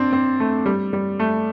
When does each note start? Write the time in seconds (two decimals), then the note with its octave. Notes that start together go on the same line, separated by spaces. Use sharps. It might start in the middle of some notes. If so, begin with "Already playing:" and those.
Already playing: C4 D4
0.13 C4
0.40 A3
0.66 G3
0.93 G3
1.20 A3